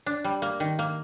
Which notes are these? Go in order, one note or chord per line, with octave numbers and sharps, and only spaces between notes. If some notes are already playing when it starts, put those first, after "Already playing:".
D4
G3
A#3
D#3
A#3